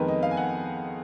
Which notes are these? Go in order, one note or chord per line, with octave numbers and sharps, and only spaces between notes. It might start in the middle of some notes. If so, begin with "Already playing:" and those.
Already playing: F2 D#3 G#3 B3 A#4 B4
D#5
F5
G#5
F#5